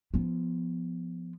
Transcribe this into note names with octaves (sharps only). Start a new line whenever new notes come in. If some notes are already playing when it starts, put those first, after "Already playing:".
F3 B3